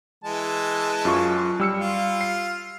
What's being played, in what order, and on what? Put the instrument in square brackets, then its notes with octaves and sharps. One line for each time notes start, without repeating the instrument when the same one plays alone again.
[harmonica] E3 G#3 A5
[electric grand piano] F#2 F4 C#6
G3 E6 C#7
[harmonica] F4
[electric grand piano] C7